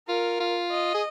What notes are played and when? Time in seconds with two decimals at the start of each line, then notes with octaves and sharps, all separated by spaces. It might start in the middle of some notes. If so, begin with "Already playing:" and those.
0.08 F4 A#4
0.40 F4
0.71 D#5
0.94 G#4